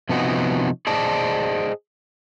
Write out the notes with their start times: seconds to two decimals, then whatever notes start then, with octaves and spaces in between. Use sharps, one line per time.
0.09 C3 F3 B3 C#4 D#4 F#4
0.87 G#4 C5 D5 D#5 A5